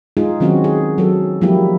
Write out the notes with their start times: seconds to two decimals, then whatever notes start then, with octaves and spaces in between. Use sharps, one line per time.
0.17 G#3 D#4 F4 G#4
0.40 D#3 F#3 C4 C#4 F#4
0.64 G#4
0.98 F#3 A4
1.42 F3 F#3 G#3 A#3 E4 G4